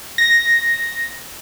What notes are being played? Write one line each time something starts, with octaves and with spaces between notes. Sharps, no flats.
A#6